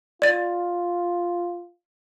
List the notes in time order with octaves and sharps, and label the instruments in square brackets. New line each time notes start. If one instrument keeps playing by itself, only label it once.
[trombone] F4 [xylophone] D5 A6